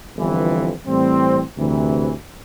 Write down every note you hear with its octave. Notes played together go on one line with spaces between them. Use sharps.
G1 F2 E3
A2 E3 G3 C4
D2 C3 E3